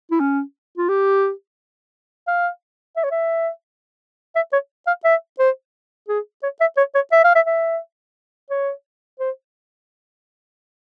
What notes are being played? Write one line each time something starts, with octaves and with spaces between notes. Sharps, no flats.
E4
C#4
F4
G4
F5
E5
C#5
E5
E5
C#5
F5
E5
C5
G#4
C#5
E5
C#5
C#5
E5
F5
E5
E5
C#5
C5